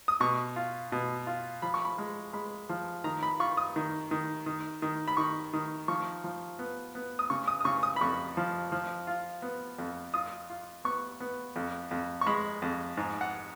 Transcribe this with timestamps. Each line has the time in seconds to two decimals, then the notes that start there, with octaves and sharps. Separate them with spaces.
0.08 D#6
0.20 B2 C#6
0.56 F4
0.92 B2
1.27 F4
1.62 F3 B5
1.74 C#6
1.85 B5
1.98 G#3
2.33 G#3 B5
2.69 F3
3.04 D#3 A#5
3.23 B5
3.39 F4 C#6
3.57 D#6
3.76 D#3
4.11 D#3
4.46 D#3
4.82 D#3
5.08 B5
5.17 D#3 C#6
5.53 D#3
5.88 F3 C#6
6.24 F3
6.59 B3
6.95 B3
7.19 D#6
7.30 C#3 C#6
7.48 D#6
7.61 D#6
7.65 C#3 C#6
7.83 D#6
7.96 B5
8.01 F2 C#6
8.37 F3
8.72 F3
9.07 F4
9.42 B3
9.79 F2
10.14 F4 D#6
10.50 F4
10.85 B3 C#6
11.20 B3
11.56 F2
11.91 F2
12.21 C#6
12.26 G#3 B5
12.62 F2
12.97 G#2
13.21 F#5